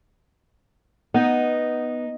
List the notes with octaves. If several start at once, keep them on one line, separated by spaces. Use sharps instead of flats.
B3 D#4